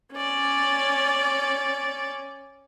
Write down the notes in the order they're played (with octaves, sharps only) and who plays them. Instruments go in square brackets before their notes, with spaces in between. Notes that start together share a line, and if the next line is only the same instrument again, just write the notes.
[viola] C#4 D5